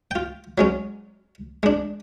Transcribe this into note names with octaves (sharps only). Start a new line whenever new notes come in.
F4 G5
F#3 G#3 C#4
G#3 D4